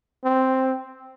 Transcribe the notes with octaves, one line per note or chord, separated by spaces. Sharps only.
C4